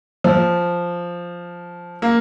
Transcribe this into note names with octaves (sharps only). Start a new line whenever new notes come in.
F3
A#3